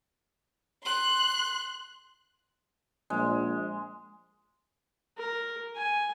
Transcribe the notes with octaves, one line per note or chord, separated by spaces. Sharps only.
C6 F#6
A#1 G#3
A#4
G#5